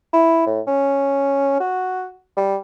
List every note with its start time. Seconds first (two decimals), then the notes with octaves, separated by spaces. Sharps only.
0.13 E4
0.46 A2
0.67 C#4
1.60 F#4
2.37 G3